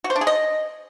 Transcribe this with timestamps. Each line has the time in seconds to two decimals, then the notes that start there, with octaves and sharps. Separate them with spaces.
0.04 F#4
0.10 C5
0.16 D4
0.21 G#4
0.27 D#5